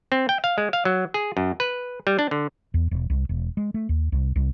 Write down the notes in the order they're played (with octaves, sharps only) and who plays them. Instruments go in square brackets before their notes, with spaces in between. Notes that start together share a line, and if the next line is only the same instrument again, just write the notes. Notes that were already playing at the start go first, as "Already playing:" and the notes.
[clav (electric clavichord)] C4
G5
F5
G#3
F5
F#3
G#4
F#2
B4
G3
D4
D3
[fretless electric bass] E2
E1
C2
E1
G#3
A3
D#2
C2
C2